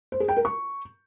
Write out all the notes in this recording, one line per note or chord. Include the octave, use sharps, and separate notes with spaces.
C5
G#4
G5
A#4
C#6